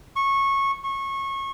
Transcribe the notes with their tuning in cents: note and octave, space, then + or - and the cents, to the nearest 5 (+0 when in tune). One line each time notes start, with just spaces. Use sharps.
C#6 -15
C#6 -25